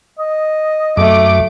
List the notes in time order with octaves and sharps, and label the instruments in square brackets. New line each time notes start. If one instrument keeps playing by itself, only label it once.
[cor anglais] D#5
[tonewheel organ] F#2 D6 [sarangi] A3